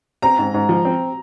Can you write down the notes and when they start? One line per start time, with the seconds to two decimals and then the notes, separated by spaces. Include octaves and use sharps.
0.22 C4 A#5
0.39 G#2
0.54 G#2
0.69 F3
0.85 C4